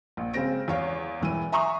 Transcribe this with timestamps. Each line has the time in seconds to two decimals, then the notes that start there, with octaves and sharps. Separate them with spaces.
0.17 A#1
0.33 C#3 G#3 C4 A#6 D7
0.68 E2 C#5 F5
1.21 E1 E3 D#7
1.52 E5 G#5 A#5 C6 C#6 D#6